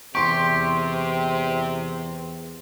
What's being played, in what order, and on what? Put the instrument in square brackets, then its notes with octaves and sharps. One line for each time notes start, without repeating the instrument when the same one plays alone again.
[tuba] E2 [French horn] C3 [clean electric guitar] G4 [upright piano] C6 C#6